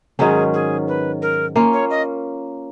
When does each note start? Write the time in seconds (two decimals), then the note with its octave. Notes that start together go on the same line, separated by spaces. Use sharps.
0.19 G#2 D#3 F#3 C#4 G#4
0.54 G#4
0.88 B4
1.22 A#4
1.56 A#3 C#4 F4
1.73 C#5
1.90 D#5